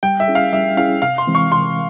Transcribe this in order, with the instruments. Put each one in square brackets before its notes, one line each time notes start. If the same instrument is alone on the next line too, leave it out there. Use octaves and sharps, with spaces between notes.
[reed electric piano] G3 [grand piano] G5
[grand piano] E5
[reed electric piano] C#4 E4 G#4
[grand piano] F5
[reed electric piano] G3 [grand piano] E5
[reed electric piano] C#4 E4 G#4 [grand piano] F5
[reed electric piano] C3 [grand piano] F5
[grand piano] C6
[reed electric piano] E3 G#3 C4
[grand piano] C#6
[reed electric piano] C3 [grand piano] C6